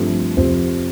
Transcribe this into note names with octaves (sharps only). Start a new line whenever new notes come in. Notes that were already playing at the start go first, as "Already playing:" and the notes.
Already playing: G2 F3 A3 C4 A4
F2 C3 F3 C4 C5